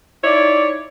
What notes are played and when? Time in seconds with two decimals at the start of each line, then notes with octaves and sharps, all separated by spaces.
0.24 D#4 E4 C#5 D5